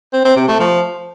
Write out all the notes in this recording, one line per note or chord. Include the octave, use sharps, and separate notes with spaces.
C4
C4
C3
A3
F3